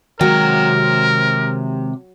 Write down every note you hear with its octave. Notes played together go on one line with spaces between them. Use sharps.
C3 D#3 F#3 G#3 A#4 G5